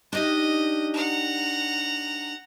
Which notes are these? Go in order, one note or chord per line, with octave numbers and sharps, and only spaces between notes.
D4 D#4 G4 D#5
F#5 A#5